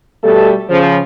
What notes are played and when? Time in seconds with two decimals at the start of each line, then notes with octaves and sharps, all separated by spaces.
0.22 B2 G3 A3 G4 A4
0.69 C#3 F3